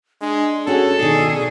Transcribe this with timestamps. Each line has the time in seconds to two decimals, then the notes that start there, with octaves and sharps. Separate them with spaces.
0.21 G#3 D4
0.67 C#4 F#4 G#4 A4
0.99 B2 D#3 D4 D#4 G#4